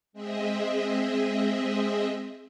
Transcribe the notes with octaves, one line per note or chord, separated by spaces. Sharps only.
G#3 C4 G#4 D#5 E5